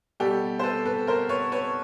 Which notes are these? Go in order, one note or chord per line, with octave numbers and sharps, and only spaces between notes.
B2 G3 G4 A4
C5
A4 B4
A4 B4
A#4 C5
B4 C#5
B4 C#5